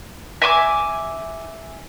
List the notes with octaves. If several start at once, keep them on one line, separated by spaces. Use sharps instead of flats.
E5 G#5 C6 D6